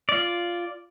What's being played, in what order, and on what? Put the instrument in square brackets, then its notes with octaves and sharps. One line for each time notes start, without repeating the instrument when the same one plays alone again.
[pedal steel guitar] F4 D5